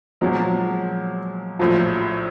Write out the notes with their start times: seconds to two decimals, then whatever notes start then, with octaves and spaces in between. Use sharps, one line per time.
0.21 A#2 F3 F#3 G#3
1.59 A#1 A2 F3 F#3